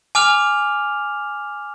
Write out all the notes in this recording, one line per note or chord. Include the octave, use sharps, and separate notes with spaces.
G#5 D6 F6 F7